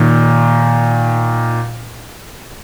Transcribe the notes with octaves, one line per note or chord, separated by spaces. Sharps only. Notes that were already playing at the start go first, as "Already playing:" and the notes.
Already playing: A#2 D#3